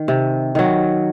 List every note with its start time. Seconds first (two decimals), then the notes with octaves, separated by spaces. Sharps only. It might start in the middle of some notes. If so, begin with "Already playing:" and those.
Already playing: D#3
0.08 C3
0.55 D#3 F#3